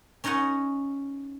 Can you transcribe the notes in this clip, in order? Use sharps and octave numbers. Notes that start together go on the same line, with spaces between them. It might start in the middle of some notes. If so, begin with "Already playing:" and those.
C#4 D#4 C#5 D#5 F#5